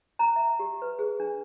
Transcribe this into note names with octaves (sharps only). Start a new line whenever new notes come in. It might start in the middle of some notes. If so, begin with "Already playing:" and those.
A#5
E5
G4
B4
G#4
D4